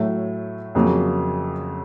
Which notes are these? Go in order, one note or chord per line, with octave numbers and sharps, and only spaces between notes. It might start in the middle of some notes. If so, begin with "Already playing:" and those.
Already playing: A2 F#3 A3
F2 C#3 F#3 A#3